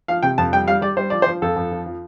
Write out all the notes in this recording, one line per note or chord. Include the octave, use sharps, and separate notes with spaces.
F3 F5
C3 G5
F2 A5
G3 G5
G3 F5
G3 D5
G3 C5
F3 D5
C5
F3
F2 A4
F2
F3
F3